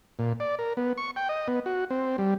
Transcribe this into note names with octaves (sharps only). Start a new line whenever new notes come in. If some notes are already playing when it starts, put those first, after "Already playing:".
A#2
D5
A#4
B3
C#6
G5
D#5
B3
F#4
C4
G3